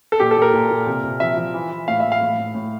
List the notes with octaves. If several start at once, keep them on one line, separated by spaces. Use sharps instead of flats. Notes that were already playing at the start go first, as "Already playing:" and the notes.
A4
A#2 G4
A4
A#2
A#4
A#2
A#2
C3
C3
F3 E5
F3
E3
E3
A2 F5
A2 E5
F5
A2
A2
A2